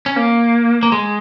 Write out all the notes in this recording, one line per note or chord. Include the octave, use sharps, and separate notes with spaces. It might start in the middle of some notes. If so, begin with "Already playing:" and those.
C#4
A#3
A#3
G#3